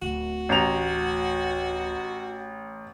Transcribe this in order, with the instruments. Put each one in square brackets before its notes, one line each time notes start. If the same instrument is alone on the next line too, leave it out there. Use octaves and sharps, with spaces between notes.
[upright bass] D1 [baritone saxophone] F#4
[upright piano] A1 A#5 F7